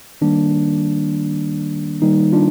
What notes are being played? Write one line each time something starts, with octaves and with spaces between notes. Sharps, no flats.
D#3 G3 A#3 D4
D#3 G3 A#3 D#4
D4 F4